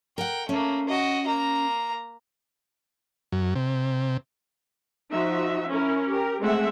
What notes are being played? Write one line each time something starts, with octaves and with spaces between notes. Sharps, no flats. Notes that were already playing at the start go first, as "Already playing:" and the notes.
A#4 F#5 G5
A3 A#3 C#4
F#4 D#5
A#3 A#5
F#2
C3
F3 D#4 F#4 E5
C#4 E4 A#4
G4 A#4
G#3 A3 C4 G#4 E5 F#5